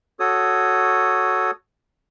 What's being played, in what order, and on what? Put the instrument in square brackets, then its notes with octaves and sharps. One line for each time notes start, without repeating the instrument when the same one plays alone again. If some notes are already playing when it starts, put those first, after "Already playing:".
[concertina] F#4 A4 C#5 D#6